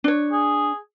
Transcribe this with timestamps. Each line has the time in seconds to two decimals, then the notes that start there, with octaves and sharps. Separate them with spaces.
0.04 D4 C#5
0.31 G#4